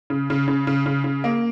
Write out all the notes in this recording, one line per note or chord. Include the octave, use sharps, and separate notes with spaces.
C#3
C#3
C#3
C#3
C#3
C#3
A#3